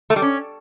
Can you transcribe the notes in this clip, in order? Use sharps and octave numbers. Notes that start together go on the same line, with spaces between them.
A3
G3
C#4